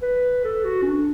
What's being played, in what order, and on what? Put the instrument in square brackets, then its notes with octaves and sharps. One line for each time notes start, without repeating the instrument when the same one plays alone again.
[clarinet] B4
A4
F#4
C#4
D4